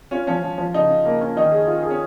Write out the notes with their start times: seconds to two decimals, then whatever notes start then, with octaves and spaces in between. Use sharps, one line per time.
0.11 C#4 F4
0.27 F3 C#4
0.43 F3
0.58 F3
0.74 C#3 D#4
0.90 C#3
1.05 A#3
1.21 C#4
1.36 D#3 D#4
1.52 G#4
1.67 F4
1.83 G#4
1.90 C#4